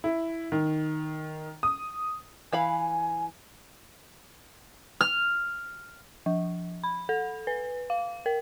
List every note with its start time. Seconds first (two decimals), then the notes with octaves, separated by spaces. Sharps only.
0.04 E4
0.52 D#3
1.63 D#6
2.53 E3 F5 G#5 B5
5.01 F6
6.26 F3
6.84 B5
7.09 A4
7.47 B4
7.90 F5
8.26 A#4